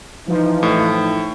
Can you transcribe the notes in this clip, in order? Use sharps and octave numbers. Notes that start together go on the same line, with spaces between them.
E3 F3 D#4
A2